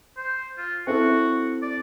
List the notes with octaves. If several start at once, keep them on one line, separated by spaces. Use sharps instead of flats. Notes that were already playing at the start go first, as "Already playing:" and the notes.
C5
F4
C4 E4 F#4 A4
D5